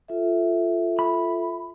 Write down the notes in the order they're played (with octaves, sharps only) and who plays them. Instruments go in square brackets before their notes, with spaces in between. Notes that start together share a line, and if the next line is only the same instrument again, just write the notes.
[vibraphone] F4 A4 E5
[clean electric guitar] B5